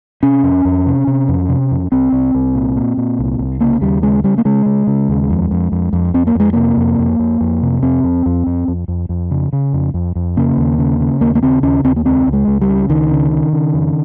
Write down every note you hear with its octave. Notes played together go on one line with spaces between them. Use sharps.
C3 C#4
F2
F2
C3
C3
F2
C3
F2
C2 C4
C2
C2
A#2
A#2
A#2
C2
C2
C#3 A#3
D#2 G3
C#3 G#3
C#3 G3
A#3
C#3 G#3
C#3
C#3
D#2
F2
F2
F2
F2
F2 C4
A#3
F2 G#3
C3 A#3
F2
F2
F2
F2
C3
F2 C4
F2
F2
F2
F2
F2
F2
C#3
C#3
F2
F2
F2
C#3 A#3
D#2
C#3
C#3
D#2 A#3
A#3
C#3 C4
D#2 C#4
D#2 C4
A#3
C#2 C4
C#2
G#3
C#2
G3
C#3
C#2 D#3
C#3
C#3
C#3
F2